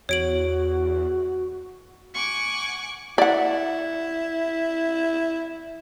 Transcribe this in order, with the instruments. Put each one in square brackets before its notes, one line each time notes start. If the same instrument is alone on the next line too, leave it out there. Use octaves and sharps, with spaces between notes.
[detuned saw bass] E2 [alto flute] F#4 [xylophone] C#5 D7 F#7
[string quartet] F#5 G#5 C#6 D6
[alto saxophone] E4 [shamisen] D5 F#5